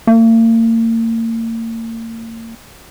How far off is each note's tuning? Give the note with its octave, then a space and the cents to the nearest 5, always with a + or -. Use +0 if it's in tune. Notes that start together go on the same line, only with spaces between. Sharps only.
A#3 -40